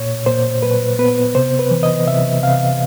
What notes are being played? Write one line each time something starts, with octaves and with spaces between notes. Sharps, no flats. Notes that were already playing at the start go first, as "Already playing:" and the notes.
Already playing: A#2 C#5
A#2 C5
A#2 B4
B3 B4
C3 C5
B4
E3
D#5
C3 E5
C3 F5